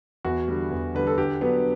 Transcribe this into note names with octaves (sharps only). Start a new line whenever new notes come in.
E2 F#4
D3 G3
E2
D3 G3 B4
A4
D3 G4
F#3 B3 D4 B4